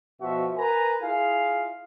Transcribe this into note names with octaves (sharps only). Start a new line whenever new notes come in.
B2 F3 F#4 E5
A#4 B4 G#5 A#5
E4 F4 G#4 F5